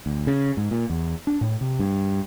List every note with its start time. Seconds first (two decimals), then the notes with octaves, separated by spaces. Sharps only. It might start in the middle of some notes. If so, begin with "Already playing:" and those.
0.06 D2
0.27 C#3
0.57 G#2
0.71 A#2
0.90 E2
1.27 D4
1.41 A2
1.61 C3
1.79 G2